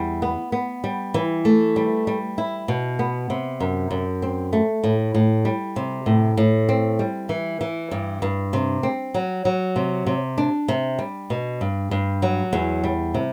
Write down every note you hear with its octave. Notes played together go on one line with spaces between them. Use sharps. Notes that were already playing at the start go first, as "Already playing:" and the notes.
Already playing: E2 G3
B3
B3
G3
E3
A3
G3
G3
E4
B2
B3
C3
F#2
F#2
C4
A3
A2
A2
G3
C3
A2
A2
C4
G3
E3
E3
G2
G2
C3
C4
F#3
F#3
C3
C3
D4
C3
G3
B2
G2
G2
F#3
E2
G3
C3